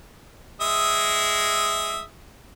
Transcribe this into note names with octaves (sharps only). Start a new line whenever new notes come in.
G#3 E5 D#6